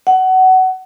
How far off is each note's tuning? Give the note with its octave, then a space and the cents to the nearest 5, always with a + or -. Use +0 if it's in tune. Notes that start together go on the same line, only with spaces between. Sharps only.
F#5 +20